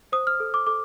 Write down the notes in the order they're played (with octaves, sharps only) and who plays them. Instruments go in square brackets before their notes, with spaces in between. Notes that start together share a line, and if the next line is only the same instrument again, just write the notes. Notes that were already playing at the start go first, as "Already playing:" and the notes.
[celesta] C5 D#6
F6
A4
D6
A4 D6